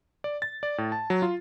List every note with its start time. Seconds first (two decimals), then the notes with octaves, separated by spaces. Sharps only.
0.24 D5
0.42 A6
0.63 D5
0.78 A2
0.92 A5
1.10 F#3
1.22 F4